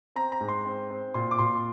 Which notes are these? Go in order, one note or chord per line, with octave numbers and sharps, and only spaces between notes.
C4 A#5
A#5
G#2
C6
C4
C4
A#2 C6
D6
A#2 C6